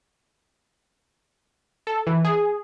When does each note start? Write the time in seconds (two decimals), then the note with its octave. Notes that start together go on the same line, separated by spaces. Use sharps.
1.87 A4
2.07 E3
2.25 G#4